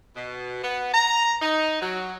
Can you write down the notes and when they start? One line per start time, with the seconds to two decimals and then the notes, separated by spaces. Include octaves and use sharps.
0.16 B2
0.63 B3
0.93 A#5
1.41 D#4
1.81 F#3